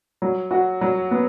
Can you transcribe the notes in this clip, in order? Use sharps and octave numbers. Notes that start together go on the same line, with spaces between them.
F#3
F#4
F#3
B3